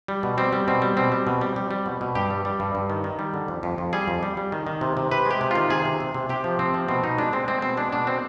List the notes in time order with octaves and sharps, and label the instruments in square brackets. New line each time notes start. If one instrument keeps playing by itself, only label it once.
[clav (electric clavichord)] G3
B2
G3 C4
G3
B2 C4
G3
B2 C4
G3
B2
G3
G3
G3
B2
B2
G2 G4
G3
G3
G2
G2
D#3
D#3
G3
D3
F2
F2
F2
G3 G#4
F2
G3
G3
D#3
D#3
C3
C3
C3 B4
G#3 G4
C3
D#3 F4
C3 G#4
C3
C3
C3
C3 G4
F3
C3 C4
F3
B2 C4
B2 D#4
G#3 D4
G#3 C4
G#3 C4
B2 C4
G#3 D4
B2 D4
C4